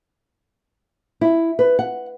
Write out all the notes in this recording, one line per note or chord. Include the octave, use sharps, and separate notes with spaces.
E4
B4
F#5